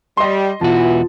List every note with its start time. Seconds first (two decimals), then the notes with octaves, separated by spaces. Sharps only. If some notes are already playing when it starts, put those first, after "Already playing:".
0.17 G3 D#5 C6
0.61 E2 B2 E3 F4 F#4 A5